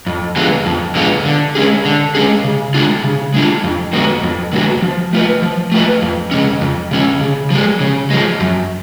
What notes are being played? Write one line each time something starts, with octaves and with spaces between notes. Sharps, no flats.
F2
D3 G#3 B3 F4
F2
D3 G#3 B3 F4
D3
G#3 C#4 G#4
D3
G#3 C#4 G#4
C#3
G#3 D4 F4
C#3
G#3 D4 F4
F2
D3 G#3 B3 F#4
F2
D3 G#3 B3 F#4
F3
A3 F4 B4
F3
A3 F4 B4
F2
C#3 G#3 C#4
F2
C#3 G#3 C#4
C#3
F3 G#3
C#3
F3 G#3
F#2